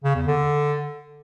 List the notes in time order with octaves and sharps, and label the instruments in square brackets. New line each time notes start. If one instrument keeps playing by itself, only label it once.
[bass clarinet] C#3
E2
D3